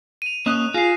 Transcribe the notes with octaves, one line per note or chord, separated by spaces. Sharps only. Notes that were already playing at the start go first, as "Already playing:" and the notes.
D#7 F7
A#3 C#4 D#5 D#6 F#6 E7
F4 G#4 A#6 C7